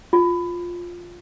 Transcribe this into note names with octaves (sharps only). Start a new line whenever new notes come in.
F4